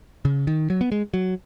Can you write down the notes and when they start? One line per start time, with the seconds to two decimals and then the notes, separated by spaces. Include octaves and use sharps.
0.25 C#3
0.47 D#3
0.70 F#3
0.81 B3
0.92 G#3
1.14 F#3